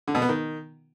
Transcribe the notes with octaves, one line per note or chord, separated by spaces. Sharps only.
D3
B2
B3
D#3